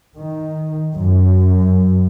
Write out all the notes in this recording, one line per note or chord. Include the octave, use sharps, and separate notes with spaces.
D#3
F#2